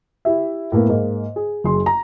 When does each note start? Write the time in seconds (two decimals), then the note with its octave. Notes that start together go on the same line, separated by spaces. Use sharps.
0.25 E4 G4 E5
0.72 A2 A#3 B3
0.89 G#2 A#3
1.36 G#4
1.64 F#1 G#4 C6
1.86 A#5